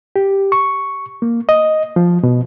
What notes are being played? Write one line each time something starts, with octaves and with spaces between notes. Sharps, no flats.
G4
C#6
A#3
D#5
F3
B2